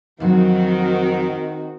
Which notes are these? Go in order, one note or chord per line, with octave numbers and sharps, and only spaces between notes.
F2 D#3 F#3 C4 F#4